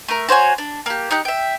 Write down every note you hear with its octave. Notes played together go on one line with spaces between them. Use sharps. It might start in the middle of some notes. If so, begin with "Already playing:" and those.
A3 A#4
F#4 C5 C#5 G#5
D4
A#3 G4
D#4 G4 F#6
E5 G5